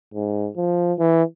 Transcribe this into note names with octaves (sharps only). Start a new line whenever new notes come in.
G#2
F3
E3